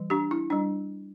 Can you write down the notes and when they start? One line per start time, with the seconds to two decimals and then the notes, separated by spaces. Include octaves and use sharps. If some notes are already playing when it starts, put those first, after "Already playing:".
Already playing: E3 G3
0.10 D4 G4
0.31 E4
0.50 G3 D4